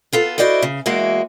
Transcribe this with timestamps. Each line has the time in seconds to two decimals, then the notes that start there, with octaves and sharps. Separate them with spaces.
0.13 B3 F4 A4
0.38 E4 F#4 C5 D5 D#5 F#5
0.62 C#3
0.86 E2 E3 G#3 A#3 F#4